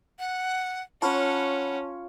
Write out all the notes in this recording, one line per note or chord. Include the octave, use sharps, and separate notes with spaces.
F#5
C#4 F4 C#5 F#5 A5 B5 F6